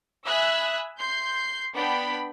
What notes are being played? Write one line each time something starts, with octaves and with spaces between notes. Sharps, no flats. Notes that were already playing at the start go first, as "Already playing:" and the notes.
E5 G#5 B5 D#6 E6 F#6
C6 G6 C7
B3 D4 G5 B5